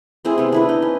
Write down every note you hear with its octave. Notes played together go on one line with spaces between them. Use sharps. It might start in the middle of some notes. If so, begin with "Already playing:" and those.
G#3 C4 E4 G#4
C3 B3
D4 E4 B4
D#4
C#4